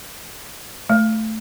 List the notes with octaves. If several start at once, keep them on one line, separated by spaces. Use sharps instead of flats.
A3